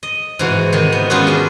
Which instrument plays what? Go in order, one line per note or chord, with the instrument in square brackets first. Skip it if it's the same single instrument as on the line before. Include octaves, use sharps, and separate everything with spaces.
[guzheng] D#5
G#2 C3 E3 F#4
C3 D#3
B3
G#3 B3 C#4 D#4 F4 F#4
G3 D4